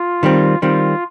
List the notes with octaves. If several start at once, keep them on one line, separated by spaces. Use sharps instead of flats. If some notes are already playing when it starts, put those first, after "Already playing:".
Already playing: F4
D#3 G3 C4
D#3 G3 C4 F4